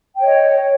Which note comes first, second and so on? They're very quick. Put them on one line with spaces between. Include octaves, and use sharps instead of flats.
G5 C#5 D#5